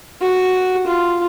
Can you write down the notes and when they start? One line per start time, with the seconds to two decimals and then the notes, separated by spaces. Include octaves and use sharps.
0.21 F#4
0.87 F4